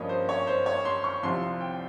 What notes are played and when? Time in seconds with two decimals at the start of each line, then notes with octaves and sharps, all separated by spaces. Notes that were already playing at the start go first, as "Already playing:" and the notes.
Already playing: G2 F3 A#3 C#4 C#5 D#5
0.09 C5
0.29 C#5
0.47 C5
0.66 C#5
0.85 C6
1.04 C#6
1.23 C2 C3 F3 C6
1.42 C6
1.61 G5